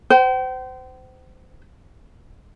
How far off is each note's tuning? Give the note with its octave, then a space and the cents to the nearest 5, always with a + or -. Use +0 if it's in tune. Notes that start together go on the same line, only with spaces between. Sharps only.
C5 -25 G5 -45